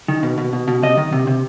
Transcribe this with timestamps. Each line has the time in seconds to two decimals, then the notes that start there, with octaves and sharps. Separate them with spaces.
0.08 D#3
0.23 B2
0.38 B2
0.53 B2
0.67 B2
0.82 C3 D#5
0.97 D#3
1.12 C3
1.27 C3